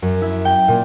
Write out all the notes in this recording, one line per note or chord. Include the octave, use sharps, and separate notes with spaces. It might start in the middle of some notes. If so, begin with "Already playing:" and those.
F#2
E4
G5
A#2